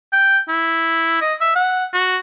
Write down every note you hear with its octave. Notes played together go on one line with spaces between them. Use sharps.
G5
E4
D#5
E5
F#5
F#4